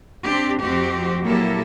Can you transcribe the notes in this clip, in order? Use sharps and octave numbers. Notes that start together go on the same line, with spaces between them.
C4 D4 G4
F2 F3 C4 F#4 G4
A#2 F#3 A#3 E4 G4 A4